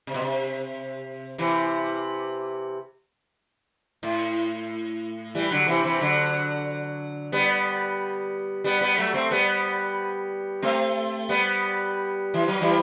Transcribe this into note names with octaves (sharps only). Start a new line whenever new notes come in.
C3
B2
C3
C3 E3
A2
E3 G3
D3 F#3
C3 E3
C3 E3
D3 F#3
G3 B3
G3 B3
G3 B3
F#3 A3
A3 C4
G3 B3
A3 C4
G3 B3
E3
F#3
E3 G3